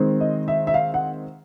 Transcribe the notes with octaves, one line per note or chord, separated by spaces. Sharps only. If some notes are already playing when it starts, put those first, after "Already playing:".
Already playing: D#3 G#3 C4
D#5
E5
E5
F5
F#5